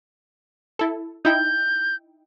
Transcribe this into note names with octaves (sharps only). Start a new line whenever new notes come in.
E4 A4
D#4 E4 G5 G6